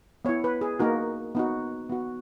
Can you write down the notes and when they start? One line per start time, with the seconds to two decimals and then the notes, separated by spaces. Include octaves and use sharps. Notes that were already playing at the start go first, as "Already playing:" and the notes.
0.25 B3 E4 C#5
0.44 B4
0.61 G#4
0.80 A#3 D#4 F#4 A#4
1.35 B3 D#4 F#4
1.89 B3 F#4